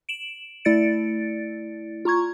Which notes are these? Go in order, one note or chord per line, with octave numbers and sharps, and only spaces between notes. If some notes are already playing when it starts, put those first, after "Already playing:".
D7 E7 F#7
A3 E4 D5 A6 C#7 D7
F4 A#5 C#6 G#6